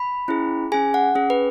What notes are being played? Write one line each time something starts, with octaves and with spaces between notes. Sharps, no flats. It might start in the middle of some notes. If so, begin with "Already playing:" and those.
Already playing: B5
C#4 E4 G#4
C#4 G#4 G#5
F#5
C#4 G#4
B4